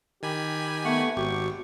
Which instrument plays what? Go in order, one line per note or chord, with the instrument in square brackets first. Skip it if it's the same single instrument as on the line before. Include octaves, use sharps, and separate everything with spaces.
[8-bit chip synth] D#3 G#5 B5 [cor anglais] G4
[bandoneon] A3 F#5 C#6 [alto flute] B3
[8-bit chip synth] G#1 [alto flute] F#4 [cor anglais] G4 [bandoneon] C#6